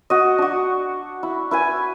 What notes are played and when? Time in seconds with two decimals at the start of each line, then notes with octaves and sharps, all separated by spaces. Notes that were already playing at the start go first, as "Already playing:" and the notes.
0.10 F#4 D#5
0.38 D4 F#4
1.23 E4
1.51 E4 B4 G#5